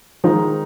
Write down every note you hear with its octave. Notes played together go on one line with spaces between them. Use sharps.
D#3 F3 G#3 D#4